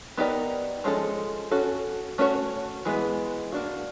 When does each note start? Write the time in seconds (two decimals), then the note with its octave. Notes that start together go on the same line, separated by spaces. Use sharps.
0.17 B3 D#4 G4 A#4 D5
0.84 F3 G#3 C#4 F4 A4
1.51 C#4 F#4 A4
2.18 A3 C#4 F#4 A#4 C#5
2.85 E3 G#3 B3
3.52 A#3 D4 F#4